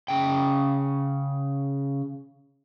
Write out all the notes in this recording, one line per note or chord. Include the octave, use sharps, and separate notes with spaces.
C#3 G5